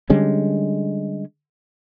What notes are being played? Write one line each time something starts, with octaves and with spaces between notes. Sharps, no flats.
D3 G3 G#3 C#4